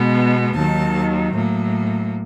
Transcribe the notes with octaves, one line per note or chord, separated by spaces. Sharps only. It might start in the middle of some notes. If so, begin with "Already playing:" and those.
Already playing: B2 G#3 B3
D#2 D#3 F#3 A5
A2 F#3 A#3